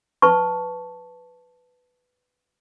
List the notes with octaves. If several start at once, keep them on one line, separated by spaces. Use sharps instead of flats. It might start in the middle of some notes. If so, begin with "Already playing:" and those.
B4 A5 C#6